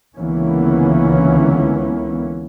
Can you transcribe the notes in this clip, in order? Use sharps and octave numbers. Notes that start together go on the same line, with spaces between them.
C#2 D3 E3 A#3 B3 C#4